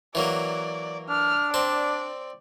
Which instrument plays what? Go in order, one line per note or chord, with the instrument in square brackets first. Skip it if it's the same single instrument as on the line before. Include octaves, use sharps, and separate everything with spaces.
[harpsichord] E3 F#3 A#3 [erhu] D5
[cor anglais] D4 [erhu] F6
[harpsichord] C4 A5 [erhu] D5